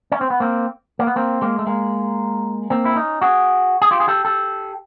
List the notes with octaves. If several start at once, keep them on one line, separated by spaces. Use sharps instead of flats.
C#4
C4
B3
A#3 C4
A#3
B3
A#3 C4
G#3 A#3
A3
G#3 A#3
A#3 C4
E4
C#4 D#4
F#4 G#4
G#4
F4 G4
G#4
G4 A4
G4 A4